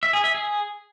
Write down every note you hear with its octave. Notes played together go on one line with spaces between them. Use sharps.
E5
G#4
E5
G#4